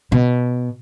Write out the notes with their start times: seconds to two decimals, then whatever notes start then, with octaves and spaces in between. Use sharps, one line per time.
0.12 B2